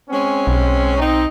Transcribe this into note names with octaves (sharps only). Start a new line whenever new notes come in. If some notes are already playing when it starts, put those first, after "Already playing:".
G#3 C4 C#4
B1
C4 D#4